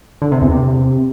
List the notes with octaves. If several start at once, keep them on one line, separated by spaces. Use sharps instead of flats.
D3
C3
E2
C3